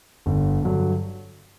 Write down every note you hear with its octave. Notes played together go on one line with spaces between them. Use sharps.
G1
G2 D3 F#3